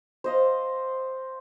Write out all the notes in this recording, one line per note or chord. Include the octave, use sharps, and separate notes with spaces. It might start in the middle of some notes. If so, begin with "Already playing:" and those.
C5 D#5 F5